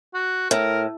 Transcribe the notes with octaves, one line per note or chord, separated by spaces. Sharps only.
F#4
A2 A#4